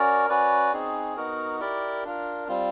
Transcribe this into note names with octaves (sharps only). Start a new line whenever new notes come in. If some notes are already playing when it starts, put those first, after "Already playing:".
Already playing: C#4 F#4 A#4 D5
C#4 F#4 B4 D5
C4 D#4 G#4
B3 D#4 F#4 A#4
E4 G4 A#4 D5
D4 F4 A#4
G3 C4 F4